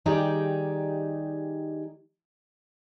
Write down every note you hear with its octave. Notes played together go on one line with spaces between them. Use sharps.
D#3 G3 D#4 G4 G#4 D5